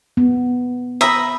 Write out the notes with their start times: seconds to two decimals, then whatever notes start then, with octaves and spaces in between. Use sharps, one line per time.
0.17 B3
1.01 E5 A#5 B5 D#6